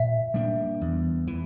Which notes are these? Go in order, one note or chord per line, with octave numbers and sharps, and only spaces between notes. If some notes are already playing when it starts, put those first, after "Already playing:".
Already playing: A#2 E5
G3 A#3 D4
E2
E3